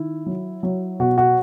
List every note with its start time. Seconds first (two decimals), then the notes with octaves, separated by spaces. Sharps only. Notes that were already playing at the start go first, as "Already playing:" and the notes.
Already playing: D#3 E4
0.26 F#3
0.63 F#3
1.00 B2 F#4
1.18 F#4